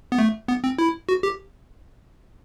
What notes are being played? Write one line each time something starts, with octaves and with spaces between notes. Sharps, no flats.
B3
A3
B3
C4
E4
F#4
G4